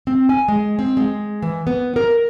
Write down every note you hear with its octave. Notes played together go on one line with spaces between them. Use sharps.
C4
G#5
G#3
C4
G#3
E3
B3
A#4